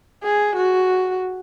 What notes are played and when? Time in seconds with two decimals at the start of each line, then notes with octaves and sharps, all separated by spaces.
0.23 G#4
0.56 F#4